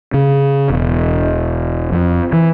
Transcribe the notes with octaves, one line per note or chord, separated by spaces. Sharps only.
C#3
E1
F2
E3